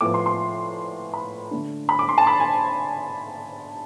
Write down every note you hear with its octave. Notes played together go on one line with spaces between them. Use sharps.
A2 F3 B3 D6
C6
C6
B5
D3 A3 D4
B5
D6
C6
A5
B5
G#5